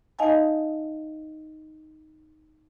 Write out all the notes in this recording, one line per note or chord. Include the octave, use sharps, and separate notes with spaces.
D#4 D#5 F5 G#5 A5